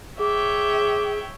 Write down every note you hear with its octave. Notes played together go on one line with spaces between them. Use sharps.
G#4 C#5 E5 G5 D6